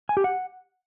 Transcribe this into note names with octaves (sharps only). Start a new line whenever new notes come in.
G#5
G4
F#5